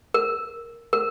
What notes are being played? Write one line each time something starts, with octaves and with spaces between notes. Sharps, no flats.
A#4
A#4